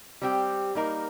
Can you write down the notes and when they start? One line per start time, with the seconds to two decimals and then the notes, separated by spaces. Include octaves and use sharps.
0.22 G3 C4 G4
0.75 G3 A#3 D#4 A#4